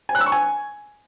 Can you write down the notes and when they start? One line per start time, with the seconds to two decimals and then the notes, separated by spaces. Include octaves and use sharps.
0.09 G#5
0.15 F#6
0.21 E6
0.26 C#6
0.32 G#5